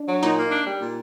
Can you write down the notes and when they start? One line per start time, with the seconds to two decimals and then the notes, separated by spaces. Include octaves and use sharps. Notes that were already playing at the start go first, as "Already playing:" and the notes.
Already playing: D4
0.09 F#3
0.23 A#2 D#4
0.38 A#3
0.52 D4
0.67 G3
0.81 A#2